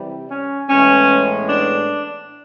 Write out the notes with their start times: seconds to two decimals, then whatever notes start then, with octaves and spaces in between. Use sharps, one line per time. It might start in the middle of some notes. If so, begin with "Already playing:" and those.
Already playing: C3 E3 G3
0.30 C#4
0.69 A2 E3 G#3 B3 C#4
1.48 D4